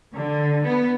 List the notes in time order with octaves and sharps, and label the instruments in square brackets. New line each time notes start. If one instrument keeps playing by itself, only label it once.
[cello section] D3
B3